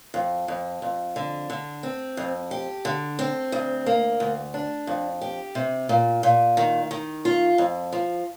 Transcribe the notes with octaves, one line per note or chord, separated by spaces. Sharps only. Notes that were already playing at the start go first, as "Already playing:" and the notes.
F2
F2
F2
D3
D3
C4
F2
G4
D3
C4
D2
A#3
D2
D4
F2
G4
C3
A#2
A#2
D#3
D#3
F4
F2
F3